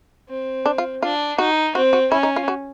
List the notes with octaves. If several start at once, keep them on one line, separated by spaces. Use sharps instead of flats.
C4
D4
F4
D4 F4
D#4 F#4
C4 F#4
F#4
C#4 E4
D#4
F4
F#4